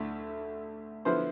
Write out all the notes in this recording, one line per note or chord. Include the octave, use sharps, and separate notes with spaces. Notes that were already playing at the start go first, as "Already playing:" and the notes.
Already playing: D2 D3 A3 E4
D3 F3 B3 E4 C5